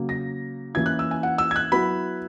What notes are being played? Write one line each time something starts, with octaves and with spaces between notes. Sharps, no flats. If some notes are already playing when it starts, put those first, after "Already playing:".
Already playing: C#3 F#3 A#3
A#6
E3 A#3 C#4 E4 G#6
F#6
E6
G#5
F#5
E6
G#6
F#6
F#3 B3 E4 B5